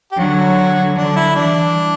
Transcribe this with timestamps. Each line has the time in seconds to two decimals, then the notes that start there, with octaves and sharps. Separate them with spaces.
0.12 G4
0.18 D3 F#3 F#4
0.96 D3 F#3 D4
1.16 E4
1.35 E3 G3 D4